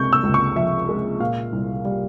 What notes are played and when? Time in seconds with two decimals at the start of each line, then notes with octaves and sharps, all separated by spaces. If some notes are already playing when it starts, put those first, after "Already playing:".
Already playing: C#2 C3 G#3 C#6 G6
0.13 E6
0.23 C#2
0.34 C#6
0.56 F3 E5
0.89 G#3
1.20 A#2 F5
1.53 C2
1.85 G3